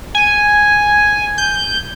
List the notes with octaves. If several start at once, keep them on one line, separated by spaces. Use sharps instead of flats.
G#5
G6